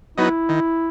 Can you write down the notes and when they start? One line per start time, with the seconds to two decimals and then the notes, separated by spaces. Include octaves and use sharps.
0.17 F#3 B3 D#4 E4
0.49 D#3